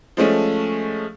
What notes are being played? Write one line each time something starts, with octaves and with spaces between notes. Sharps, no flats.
F3 G#3 A3 C#4